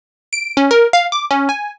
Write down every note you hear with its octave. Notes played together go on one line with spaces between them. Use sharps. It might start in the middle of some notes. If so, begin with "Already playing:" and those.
D7
C#4
A#4
F5
D6
C#4
G#5